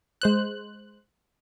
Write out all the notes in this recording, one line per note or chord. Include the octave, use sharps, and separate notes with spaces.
G#3 C5 F#6